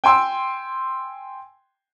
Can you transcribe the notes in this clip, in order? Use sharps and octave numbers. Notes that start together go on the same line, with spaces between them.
G5 G#5 C6 E6